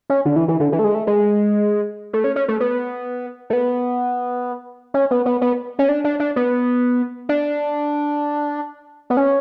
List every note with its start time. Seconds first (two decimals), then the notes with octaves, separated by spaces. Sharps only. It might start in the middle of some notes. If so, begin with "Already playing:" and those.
0.10 C#4
0.25 D3
0.36 E3
0.48 E3
0.60 D3
0.72 E3
0.79 A3
0.84 G#3
0.95 A3
1.07 G#3
2.13 A3
2.24 C#4
2.36 C#4
2.48 A3
2.60 B3
3.50 A3
3.53 B3
4.94 C#4
5.11 B3
5.26 B3
5.41 B3
5.79 C#4
5.89 D4
6.04 D4
6.20 D4
6.36 B3
7.29 D4
9.10 B3
9.17 C#4